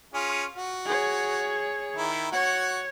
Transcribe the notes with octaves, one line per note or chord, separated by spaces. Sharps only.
C#4 F4 G#4
F#4
G#4 C#5
D#3 E4
F#4 C#5 F#5